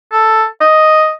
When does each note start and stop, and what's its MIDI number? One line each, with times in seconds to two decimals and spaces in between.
0.12 0.44 69
0.61 1.11 75